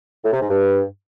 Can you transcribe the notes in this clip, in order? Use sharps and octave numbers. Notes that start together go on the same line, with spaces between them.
A2
C3
G#2
G2